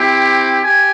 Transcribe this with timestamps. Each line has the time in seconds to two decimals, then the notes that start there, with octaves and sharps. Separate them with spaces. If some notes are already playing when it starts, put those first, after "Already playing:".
Already playing: C4 E4 G4
0.63 G4 G#5